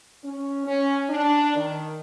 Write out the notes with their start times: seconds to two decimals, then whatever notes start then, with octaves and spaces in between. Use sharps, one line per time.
0.24 C#4
0.66 C#4
1.10 D4
1.55 D#3